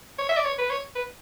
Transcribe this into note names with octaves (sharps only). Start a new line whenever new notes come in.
C#5
E5
D5
C#5
B4
C#5
B4